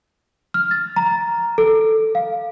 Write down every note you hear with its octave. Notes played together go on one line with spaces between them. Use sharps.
F6
A6
A#5
A4
F5